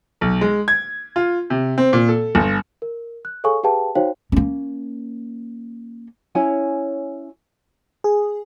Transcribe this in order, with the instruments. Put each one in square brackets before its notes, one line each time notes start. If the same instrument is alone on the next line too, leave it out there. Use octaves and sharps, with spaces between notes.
[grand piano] B1
G#3
G#6
F4
C3
C4
A#2
A4
G1
[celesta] A#4
F#6
G#4 A4 C#5 F5 G#5 C#6
G4 G#4 B4 F5 G5 A5
D#4 F#4 C5 C#5 F5 G5
[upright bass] A#3 C#4
[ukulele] C#4 E4 C#5 G#5
[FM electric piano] G#4